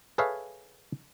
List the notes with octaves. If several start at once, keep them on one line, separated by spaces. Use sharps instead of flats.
G#4 A4 B4 C#5 E5 F5